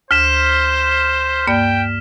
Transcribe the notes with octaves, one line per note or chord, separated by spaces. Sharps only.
D2 C5 F6 B6 E7
G2 A#3 D5 G5